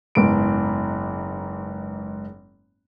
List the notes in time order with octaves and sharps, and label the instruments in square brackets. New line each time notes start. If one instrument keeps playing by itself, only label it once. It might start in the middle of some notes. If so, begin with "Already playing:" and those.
[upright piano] F#1 G#2 B3 D7